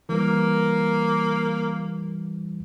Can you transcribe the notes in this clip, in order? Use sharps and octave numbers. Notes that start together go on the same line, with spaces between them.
E3 G3 A#3